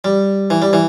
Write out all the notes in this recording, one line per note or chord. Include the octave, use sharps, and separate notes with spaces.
G3
E3
G3
E3